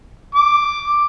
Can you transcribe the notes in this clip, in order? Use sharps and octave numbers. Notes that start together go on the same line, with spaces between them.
D6